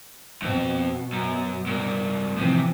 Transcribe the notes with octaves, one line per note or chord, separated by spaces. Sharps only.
F2 B2 C4
F#2
G2 A#3
A2 C3 E3 F3